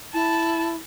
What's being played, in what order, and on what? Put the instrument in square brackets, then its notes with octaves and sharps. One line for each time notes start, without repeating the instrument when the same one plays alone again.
[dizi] E4 [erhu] A5